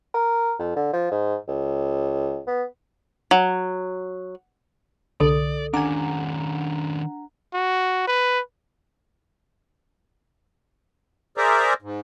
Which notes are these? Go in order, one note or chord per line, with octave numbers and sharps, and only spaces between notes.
A#4
F2
D3
F3
G#2
C#2
B3
F#3
C2 D3 A4 D5
D#3 C#4 D4 F#5 G#5 A#5 D6
F#4
B4
G#4 A#4 C5 D5 E5 A#5
G#2